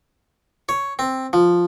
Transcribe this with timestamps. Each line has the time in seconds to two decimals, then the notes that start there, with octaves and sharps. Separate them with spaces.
0.69 C#5
0.99 C4
1.33 F3